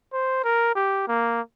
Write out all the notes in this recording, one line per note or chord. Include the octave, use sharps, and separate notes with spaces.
C5
A#4
G4
A#3